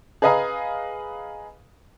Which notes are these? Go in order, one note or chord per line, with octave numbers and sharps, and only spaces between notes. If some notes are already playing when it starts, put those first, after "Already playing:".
G#4 B4 D#5 F5 G#5 A#5